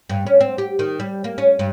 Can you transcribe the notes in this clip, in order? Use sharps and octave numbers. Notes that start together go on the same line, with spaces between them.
G2
C#4
C4
G4
D#3
G3
A#3
C#4
G2